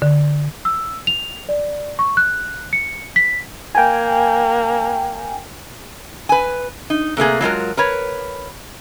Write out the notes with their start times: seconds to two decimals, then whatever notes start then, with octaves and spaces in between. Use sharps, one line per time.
0.02 D3
0.65 E6
1.07 F7
1.49 D5
1.99 C#6
2.17 F#6
2.73 C#7
3.16 B6
3.75 A#3 G5 G#5
6.29 B4 G#5
6.90 D#4
7.17 C3 A3 A#3 G#4
7.41 F#3 G#3 F4 A#4
7.77 A#4 B4 C#5